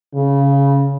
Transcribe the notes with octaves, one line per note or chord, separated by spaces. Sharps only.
C#3